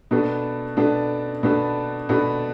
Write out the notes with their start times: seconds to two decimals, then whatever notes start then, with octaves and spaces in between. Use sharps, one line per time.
0.11 B2 B3 D4 A4
0.77 B2 B3 D4 A4
1.43 B2 B3 D4 A4
2.09 B2 B3 D4 A4